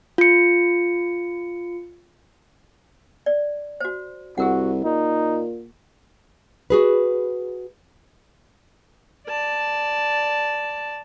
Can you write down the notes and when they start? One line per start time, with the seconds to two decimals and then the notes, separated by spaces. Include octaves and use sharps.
0.18 F4 C#7
3.26 D5
3.80 F#4 C5
4.38 C2 F#4 G#4 A#4 F#5
4.85 A#2 D#4
6.70 F#4 G#4 B4
9.27 D5 A5